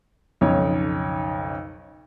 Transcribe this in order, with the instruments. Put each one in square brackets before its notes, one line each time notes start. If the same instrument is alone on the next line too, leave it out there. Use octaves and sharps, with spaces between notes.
[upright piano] B1 F2 C#3 D#4 C#5